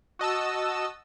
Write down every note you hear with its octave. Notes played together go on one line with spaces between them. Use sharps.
F#4 D#5 A5 E6